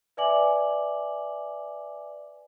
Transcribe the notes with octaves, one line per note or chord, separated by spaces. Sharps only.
B4 D5 E5 G#5 D6 F#7